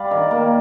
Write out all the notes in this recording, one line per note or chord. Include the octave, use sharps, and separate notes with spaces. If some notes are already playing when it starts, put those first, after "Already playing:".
Already playing: G3 D5 F5
D#3
A#3